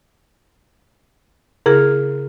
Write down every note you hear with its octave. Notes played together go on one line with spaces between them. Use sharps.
C#3 E4 G#4 A#4